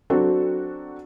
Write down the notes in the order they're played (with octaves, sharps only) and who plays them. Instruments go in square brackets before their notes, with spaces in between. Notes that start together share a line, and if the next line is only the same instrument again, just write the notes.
[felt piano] F#3 C4 D4 F#4 A4